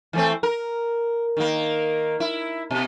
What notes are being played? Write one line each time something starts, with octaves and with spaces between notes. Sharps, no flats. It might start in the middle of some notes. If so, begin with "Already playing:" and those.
E3 A3 C4
A#4
D#3 A#3
E4
B2